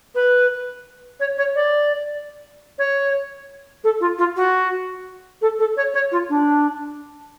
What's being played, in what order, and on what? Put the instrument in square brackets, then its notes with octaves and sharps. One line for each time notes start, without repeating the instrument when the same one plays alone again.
[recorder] B4
C#5
C#5
D5
C#5
A4
F4
F4
F#4
A4
A4
C#5
C#5
F4
D4